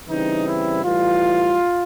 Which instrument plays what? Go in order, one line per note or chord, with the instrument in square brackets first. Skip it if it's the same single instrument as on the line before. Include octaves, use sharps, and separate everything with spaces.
[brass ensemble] C#3 E3 G3 C4 D#4
E4
A2 E3 G3 F4